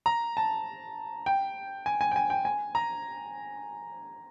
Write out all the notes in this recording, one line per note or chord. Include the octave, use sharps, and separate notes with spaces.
A#5
A5
G5
G#5
G#5
G5
G#5
G5
G#5
A#5